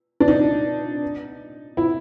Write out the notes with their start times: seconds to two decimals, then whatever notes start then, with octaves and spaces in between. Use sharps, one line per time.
0.20 D4
0.28 D#4
1.77 E4